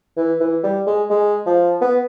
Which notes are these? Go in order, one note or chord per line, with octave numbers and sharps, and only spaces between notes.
E3
E3
G3
G#3
G#3
F3
B3